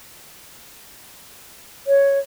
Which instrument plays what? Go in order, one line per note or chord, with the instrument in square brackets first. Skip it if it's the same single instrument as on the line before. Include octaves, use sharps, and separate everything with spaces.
[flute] C#5